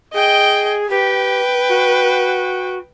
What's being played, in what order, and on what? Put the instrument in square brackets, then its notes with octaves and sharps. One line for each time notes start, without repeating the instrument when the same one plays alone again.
[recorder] G#4 [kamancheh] D#5 G5
[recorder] G4 [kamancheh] B4 G5
[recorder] F#4